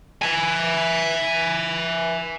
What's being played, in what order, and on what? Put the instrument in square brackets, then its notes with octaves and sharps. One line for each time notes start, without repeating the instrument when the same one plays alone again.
[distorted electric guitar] E5 G#5